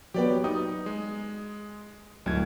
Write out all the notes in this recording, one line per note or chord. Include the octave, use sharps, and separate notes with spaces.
F#3 B3 G4 D5 G5
D#4 D#6
G#3
D1 C#2 G#6